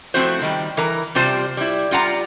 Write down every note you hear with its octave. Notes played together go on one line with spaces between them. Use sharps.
F3 A3 C4 E4 F#4 C5
D#3 G3
E3 A#4 A#5
C3 G3 F4 C5 A5
G3 E4
G3 F4 F#5 A#5